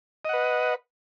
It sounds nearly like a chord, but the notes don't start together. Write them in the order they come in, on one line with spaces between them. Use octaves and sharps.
D#5 F#5 B4